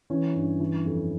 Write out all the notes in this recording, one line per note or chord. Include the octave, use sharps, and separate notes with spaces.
E3 C#4
G2
E3
F2